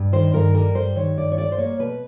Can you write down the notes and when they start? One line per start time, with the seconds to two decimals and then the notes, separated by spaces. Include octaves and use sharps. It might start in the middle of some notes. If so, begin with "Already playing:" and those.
Already playing: G2
0.12 D#3 C5
0.34 G2 A#4
0.54 G3 A#4
0.75 G2 C5
0.96 D#3 C#5
1.17 G2 D5
1.32 C#5
1.38 G3 D5
1.52 C5
1.58 A#3 C#5
1.79 B2 B4